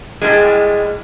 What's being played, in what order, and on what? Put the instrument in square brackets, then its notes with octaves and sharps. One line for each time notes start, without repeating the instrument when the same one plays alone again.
[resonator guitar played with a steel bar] A2 G3 G#3